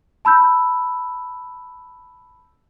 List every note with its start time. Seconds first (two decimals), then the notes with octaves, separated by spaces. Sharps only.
0.25 A5 B5 E6 G6